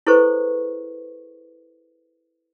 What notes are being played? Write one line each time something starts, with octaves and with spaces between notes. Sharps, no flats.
E4 G#4 A4 B4 C5 C#6